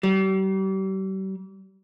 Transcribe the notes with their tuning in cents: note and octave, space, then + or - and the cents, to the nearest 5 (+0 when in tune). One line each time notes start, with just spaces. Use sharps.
G3 -40